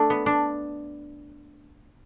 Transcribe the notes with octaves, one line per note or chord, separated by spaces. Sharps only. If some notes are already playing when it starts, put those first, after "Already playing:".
Already playing: A3 D4
B3
D4